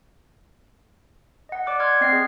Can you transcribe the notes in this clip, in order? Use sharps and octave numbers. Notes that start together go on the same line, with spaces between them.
D#5 F#5
D5 D6 F#6
C6 F6 F#6 G#6
C4 D#5 C7
G#4